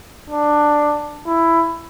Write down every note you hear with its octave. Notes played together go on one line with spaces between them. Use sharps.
D4
E4